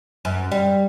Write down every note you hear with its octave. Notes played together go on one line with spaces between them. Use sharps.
F#2
G3